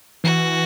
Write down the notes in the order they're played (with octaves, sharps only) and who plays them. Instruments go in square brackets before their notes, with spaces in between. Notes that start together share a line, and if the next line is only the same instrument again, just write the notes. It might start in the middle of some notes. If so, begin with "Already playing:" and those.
[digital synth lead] E3 [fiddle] F#4